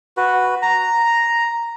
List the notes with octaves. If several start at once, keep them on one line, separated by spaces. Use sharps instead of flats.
F#4 B4
A#5